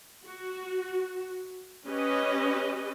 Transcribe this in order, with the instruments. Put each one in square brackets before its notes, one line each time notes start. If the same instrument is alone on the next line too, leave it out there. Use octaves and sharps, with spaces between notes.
[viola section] F#4
C#4 G4 B4 D#5